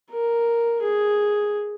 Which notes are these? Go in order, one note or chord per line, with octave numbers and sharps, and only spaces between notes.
A#4
G#4